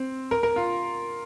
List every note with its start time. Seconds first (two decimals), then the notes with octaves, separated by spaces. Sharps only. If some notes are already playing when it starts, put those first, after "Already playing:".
Already playing: C4
0.31 A#4
0.43 A#4
0.56 F4